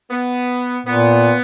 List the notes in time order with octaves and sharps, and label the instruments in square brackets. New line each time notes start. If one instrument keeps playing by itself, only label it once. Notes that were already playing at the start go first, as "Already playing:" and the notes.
[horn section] B3
[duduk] A#2 [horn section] B3